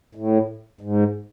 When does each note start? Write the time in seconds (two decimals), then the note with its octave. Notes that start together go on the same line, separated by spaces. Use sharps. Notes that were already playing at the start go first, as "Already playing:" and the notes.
0.15 A2
0.81 G#2